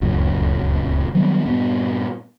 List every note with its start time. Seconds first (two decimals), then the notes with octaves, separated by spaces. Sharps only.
0.01 D1 C#2 F#2 A#2
1.14 D#3 F#3 G3 B3
1.46 G2 A#2 B3